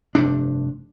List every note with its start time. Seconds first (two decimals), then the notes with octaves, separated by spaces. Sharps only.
0.15 F1 G2 C3 D4